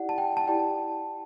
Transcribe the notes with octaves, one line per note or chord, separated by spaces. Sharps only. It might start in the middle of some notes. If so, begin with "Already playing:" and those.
Already playing: E4 G4 D5 F#5
A5
G5
A5
E4 G4 D5 G5